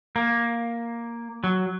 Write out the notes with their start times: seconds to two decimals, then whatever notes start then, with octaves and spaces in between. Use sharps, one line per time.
0.16 A#3
1.44 F#3